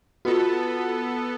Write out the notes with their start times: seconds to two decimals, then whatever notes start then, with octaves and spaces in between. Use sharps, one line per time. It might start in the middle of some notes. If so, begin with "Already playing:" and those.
0.25 B3 F4 F#4 A4